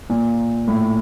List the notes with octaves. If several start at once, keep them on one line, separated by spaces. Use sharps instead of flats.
A#2
A2